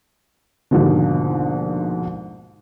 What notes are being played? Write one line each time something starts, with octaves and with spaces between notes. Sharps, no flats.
A#1 D#2 G#2 B2 D3